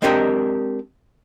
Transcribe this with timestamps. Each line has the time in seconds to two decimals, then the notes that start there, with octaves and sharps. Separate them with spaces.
0.02 G#3 C4 D4 G4 A#4 D#5